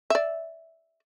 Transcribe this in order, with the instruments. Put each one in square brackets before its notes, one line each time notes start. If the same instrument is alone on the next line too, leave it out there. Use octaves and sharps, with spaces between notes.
[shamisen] D5 E5